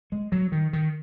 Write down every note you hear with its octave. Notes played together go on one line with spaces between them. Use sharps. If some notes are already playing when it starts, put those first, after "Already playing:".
G#3
F#3
D#3
D#3